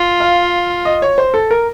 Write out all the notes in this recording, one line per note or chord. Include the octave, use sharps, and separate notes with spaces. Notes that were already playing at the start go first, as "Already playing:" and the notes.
Already playing: F4
F5
D#5
C#5
C5
A4
A#4